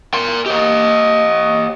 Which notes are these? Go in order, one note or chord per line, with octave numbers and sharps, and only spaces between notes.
A#4 C6
G4 C#5 D#5